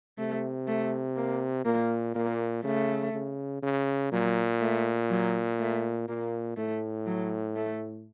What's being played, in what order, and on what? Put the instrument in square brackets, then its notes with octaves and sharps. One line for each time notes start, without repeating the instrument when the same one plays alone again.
[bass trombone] C3 [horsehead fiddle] A3
[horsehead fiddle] A3
A#3
[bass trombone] A#2 [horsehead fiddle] A#3
[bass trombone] A#2 [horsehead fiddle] A#3
[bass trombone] C#3 [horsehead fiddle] A3
[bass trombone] C#3
C#3
[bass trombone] A#2 [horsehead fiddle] F#3
[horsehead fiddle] A3
F#3
A3
[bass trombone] A#2 [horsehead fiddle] A#3
[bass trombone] A2 [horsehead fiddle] A3
[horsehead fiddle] F#3
A3